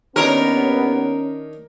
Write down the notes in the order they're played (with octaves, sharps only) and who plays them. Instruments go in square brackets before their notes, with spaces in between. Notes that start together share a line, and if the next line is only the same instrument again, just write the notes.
[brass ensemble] D#2 B3 [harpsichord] D#3 D4 C#5 [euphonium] C#4 [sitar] A#4